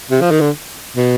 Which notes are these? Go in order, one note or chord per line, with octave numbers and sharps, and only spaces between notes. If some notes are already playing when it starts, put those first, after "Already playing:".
C3
F3
D#3
D3
B2